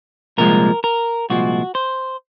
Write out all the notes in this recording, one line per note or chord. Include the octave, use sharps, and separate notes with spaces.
C2 A#2 F3 G#3 A#4
A#4
C2 A#2 F3 G#3 F#4
C5